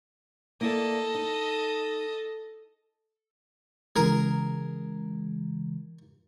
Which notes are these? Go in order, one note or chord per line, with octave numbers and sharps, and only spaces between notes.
A#3 E4 A4 D5 D#5
D#4
C#3 E3 G#3 G#4 A#4